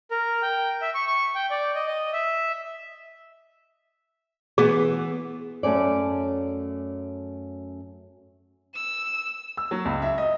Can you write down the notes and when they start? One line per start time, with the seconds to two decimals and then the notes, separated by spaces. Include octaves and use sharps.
0.11 A#4
0.42 G5
0.82 E5
0.95 C#6
1.07 C#6
1.35 G5
1.51 D5
1.75 D#5
1.87 D#5
2.13 E5
4.58 E3 B3 G#4
5.63 F#2 A3 C#4 D5
8.75 E6
9.57 E6
9.71 F#3
9.85 C#2
10.02 E5
10.18 D#5